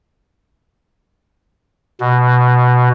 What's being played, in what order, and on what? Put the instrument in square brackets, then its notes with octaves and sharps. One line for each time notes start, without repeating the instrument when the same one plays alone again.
[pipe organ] B2